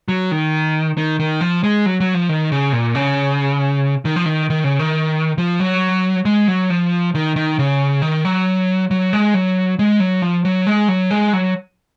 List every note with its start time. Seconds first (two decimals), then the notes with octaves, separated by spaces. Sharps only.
0.08 F#3
0.31 D#3
0.97 D#3
1.20 D#3
1.41 F3
1.64 G#3
1.86 F#3
2.00 F#3
2.14 F3
2.29 D#3
2.52 C#3
2.73 A#2
2.95 C#3
4.05 D#3
4.16 F3
4.25 D#3
4.50 D#3
4.64 C#3
4.79 D#3
5.38 F3
5.60 F#3
6.25 G#3
6.48 F#3
6.70 F3
7.15 D#3
7.36 D#3
7.59 C#3
8.02 D#3
8.25 F#3
8.91 F#3
9.13 G#3
9.34 F#3
9.79 G#3
10.00 F#3
10.22 F3
10.45 F#3
10.67 G#3
10.88 F#3
11.11 G#3
11.33 F#3